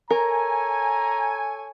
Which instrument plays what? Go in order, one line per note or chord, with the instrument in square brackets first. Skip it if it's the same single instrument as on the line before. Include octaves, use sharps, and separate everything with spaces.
[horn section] A4 C#5 G#5 [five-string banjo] A#4 [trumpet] A#5